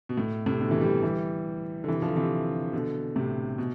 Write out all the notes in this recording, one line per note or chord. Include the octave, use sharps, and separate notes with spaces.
B2
A2
A2 C3
B2 D3
C3 E3
E3 G3
E3 G3
D3
C3 E3
D3 F3
C3 E3
B2 D3
A2 C3
B2